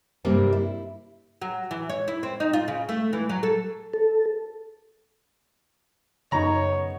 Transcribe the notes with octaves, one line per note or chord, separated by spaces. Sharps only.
G2 C3 G3 A#3 C4
E4
F#3
E3
C#5
E4
C4
D#4
F4
C#3
A3
E3
F#3
A4
A4
F#2 C#3 B3 D#4 C#5 A#5